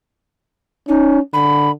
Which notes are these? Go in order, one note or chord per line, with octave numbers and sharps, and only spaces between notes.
C#4 D#4
D3 B5